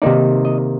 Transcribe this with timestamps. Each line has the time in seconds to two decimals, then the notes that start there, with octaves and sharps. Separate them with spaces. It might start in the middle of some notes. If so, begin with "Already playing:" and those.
0.02 C3 D#3 A#3 D#4 D5
0.45 D#5